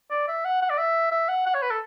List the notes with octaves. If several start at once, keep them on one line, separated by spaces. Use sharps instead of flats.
D5
E5
F#5
F#5
D5
E5
E5
F#5
F#5
C#5
B4
A4